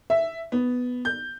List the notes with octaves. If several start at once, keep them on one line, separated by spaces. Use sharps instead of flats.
E5
B3
G6